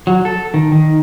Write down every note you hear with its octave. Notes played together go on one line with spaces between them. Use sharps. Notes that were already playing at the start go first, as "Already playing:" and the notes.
F#3
A4
D#3
D#3